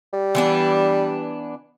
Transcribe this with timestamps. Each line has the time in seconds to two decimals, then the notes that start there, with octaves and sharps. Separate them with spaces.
0.13 G3
0.35 E3 B3 D4